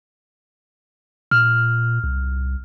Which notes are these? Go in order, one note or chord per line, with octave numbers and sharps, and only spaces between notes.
A#2 F6
C2